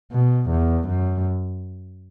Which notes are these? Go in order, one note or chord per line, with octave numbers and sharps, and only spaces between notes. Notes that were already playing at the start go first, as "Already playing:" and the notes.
B2
E2
F#2